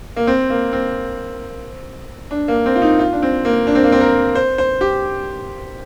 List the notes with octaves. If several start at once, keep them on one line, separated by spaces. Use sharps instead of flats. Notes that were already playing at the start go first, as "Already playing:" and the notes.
A#3
C4
A#3
C4
D4
A#3
C4
F4
D#4
F4
D4
C4
A#3
D4
C4
A#3
C4
A#4
C5
C5
G4